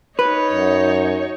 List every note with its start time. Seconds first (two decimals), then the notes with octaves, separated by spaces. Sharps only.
0.19 D#4 B4 C#5
0.52 F#2